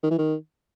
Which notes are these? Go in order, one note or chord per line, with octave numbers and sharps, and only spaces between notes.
D#3
E3
D#3